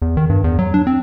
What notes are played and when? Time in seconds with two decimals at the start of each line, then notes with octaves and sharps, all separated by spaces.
0.02 E2
0.17 D#3
0.29 G2
0.44 E2
0.59 F#3
0.74 D4
0.87 C4